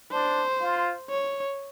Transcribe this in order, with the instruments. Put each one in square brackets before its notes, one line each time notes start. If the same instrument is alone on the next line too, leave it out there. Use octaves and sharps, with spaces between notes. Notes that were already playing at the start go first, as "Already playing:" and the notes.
[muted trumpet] D4 [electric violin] C5
[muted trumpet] F4
[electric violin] C#5